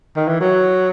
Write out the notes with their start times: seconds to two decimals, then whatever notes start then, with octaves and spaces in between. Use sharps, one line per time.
0.16 D#3
0.28 E3
0.41 F#3